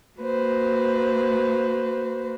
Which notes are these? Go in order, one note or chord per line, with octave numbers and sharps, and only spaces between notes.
A#3 F#4 B4 C5